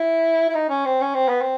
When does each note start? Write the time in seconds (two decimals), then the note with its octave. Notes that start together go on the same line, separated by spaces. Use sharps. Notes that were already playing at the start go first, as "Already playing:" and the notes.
Already playing: E4
0.49 E4
0.54 D#4
0.69 C#4
0.85 C4
1.01 C#4
1.14 C4
1.28 B3
1.41 C4